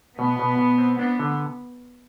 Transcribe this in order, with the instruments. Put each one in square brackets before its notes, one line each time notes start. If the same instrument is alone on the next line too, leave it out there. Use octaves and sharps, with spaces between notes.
[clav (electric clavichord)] B2 [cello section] B3
[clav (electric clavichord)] B2
B2
C4
[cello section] B3 [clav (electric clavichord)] D4
[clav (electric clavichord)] D3